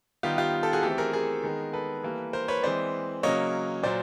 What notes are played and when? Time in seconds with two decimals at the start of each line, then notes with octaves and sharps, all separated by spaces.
0.23 D#3 G3 B3 F4 G4
0.38 F4 G4
0.63 G4 A4
0.73 F#4 G#4
0.83 E3 A3 C4 G4 A4
0.98 G#4 A#4
1.13 G#4 A#4
1.43 D#3 G#3 B3
1.73 A4 B4
2.03 E3 G3 A#3
2.33 A#4 C5
2.48 B4 C#5
2.63 E3 G#3 C4 C5 D5
3.23 C#3 F#3 A#3 C#5 D#5
3.83 A#2 F#3 C5 D5